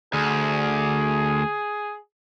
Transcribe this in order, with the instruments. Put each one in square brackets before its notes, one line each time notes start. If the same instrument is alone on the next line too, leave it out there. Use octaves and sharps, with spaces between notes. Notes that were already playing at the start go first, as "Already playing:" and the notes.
[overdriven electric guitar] D2 [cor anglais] G#4